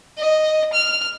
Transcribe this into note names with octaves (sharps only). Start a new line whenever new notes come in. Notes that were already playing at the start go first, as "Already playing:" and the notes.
D#5
F6